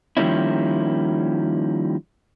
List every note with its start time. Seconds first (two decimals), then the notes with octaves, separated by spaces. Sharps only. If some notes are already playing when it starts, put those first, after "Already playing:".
0.17 D#3 F3 G3 A#3 C#4 E4